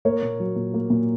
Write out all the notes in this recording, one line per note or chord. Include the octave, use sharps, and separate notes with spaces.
A#3 A#4 C#5
A#2
F#3
A#2
A#3
A#2